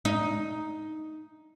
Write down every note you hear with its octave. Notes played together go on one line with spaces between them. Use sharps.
D#4